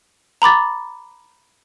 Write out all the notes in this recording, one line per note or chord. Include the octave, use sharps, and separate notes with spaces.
A#5 B5 D6 A6